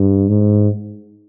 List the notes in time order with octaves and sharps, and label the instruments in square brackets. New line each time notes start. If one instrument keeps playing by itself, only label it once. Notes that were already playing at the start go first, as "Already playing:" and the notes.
Already playing: [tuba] G2
G#2